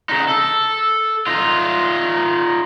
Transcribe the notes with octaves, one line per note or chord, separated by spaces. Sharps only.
C#3 D#4
A4
D#4 F4